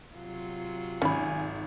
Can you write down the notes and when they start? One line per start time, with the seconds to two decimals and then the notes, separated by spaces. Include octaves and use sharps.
0.14 C3 F#3 F4
1.02 G#1 C#4 G#5 B5